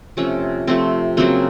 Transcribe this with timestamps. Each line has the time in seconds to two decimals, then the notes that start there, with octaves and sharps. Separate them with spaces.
0.17 C3 F3 A3 C#4
0.67 C3 F3 A3 C4
1.17 C#3 F#3 A#3 C4